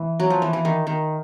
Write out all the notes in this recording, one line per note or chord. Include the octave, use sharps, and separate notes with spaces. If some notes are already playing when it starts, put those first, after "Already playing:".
Already playing: E3
F#3
F3
E3
E3
D#3
D#3